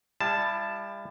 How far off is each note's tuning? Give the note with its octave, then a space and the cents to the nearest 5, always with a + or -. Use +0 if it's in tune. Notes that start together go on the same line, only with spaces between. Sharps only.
G3 +35 E4 +40 A5 +0